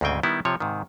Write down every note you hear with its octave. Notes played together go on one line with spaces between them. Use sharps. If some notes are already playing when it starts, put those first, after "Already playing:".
D2 G#2 C#3 C4 G5 G#5
D#3 G3 B3 E4
C3 F3 C#5
G#2 C3 D#3